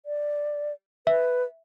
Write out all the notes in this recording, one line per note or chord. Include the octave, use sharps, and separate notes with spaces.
D5
B4 E5